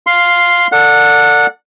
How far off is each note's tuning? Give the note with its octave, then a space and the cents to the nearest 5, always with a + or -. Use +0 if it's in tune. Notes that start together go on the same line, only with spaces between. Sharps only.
F5 +5 C6 +0
A4 +35 D5 +0 F#5 -20